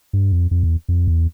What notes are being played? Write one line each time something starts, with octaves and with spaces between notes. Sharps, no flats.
G2
F2
F2
E2
F2
E2